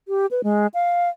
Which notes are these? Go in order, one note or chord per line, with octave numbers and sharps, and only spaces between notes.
G4
B4
G#3
F5